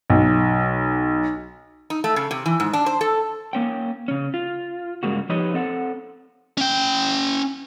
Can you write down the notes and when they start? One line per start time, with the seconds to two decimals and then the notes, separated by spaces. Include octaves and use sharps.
0.10 B1
1.90 D#4
2.04 A3
2.16 C#3
2.31 C3
2.46 E3
2.60 G#2
2.73 D4
2.86 C5
3.01 A4
3.53 A#3 C#4 G5
4.08 C#3 C#4
4.34 F4
5.03 G2 C#3 G#3 A#3 F#4
5.29 F3 D#4 G4 B4 C#5 D#5
5.54 C4 A4 F#5
6.58 C#4 G5